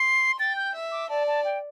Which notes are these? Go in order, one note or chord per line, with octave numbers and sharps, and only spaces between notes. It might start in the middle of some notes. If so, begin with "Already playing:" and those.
Already playing: C6 C7
G5 A6
G6
E5
D6
D5 A5
A5
G5